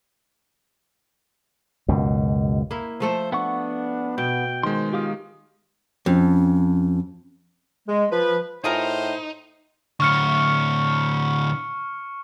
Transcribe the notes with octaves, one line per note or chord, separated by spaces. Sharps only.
C#2 F#2 B2
A#3 E4
F3 A3 A4 C5
B3 D4 F#5 C#6
B2 G5
D#3 G#3 C5 C6
F4 G4 F5 D#6
F2 C#4
G#3
F3 B4
A2 D#4 F4 G#4 A#4 C5
A2 D3 C#6 F6 C#7